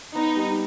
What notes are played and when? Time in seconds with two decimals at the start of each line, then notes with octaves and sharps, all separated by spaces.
0.15 B3 D#4
0.36 G3